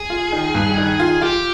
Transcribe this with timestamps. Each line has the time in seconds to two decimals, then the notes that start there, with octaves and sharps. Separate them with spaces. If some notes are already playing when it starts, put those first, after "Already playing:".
Already playing: G#4
0.10 F4
0.32 D#3
0.54 G2
0.77 D#3
1.00 F4
1.21 F4 G4